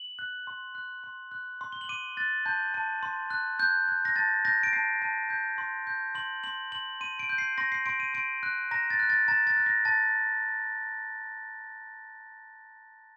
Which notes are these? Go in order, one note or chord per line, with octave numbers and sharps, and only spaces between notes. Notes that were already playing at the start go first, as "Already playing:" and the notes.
Already playing: F#7
F#6
C6
F#6
C6
F#6
C6
G7
F#7
D6 D#7
F#6 A6
A5 G6
A5
C6
F#6
F#6 G6
F#6
A#6
A5 A6
G6 A#6
D7
A5 C7
A5
G6
C6
G6
C6 F#7
C6 F#7
C6 F#7
C6 D#7
D7
G6
C7
C6 A#6
C7
C6 D7
D#7
C6 D7
F#6
A#5 A#6
A6
F#6
A6
A#5 A6
A6
F#6
A#6
A5 A6